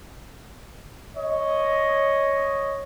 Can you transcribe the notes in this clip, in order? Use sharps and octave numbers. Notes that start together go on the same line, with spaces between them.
C#5 D#5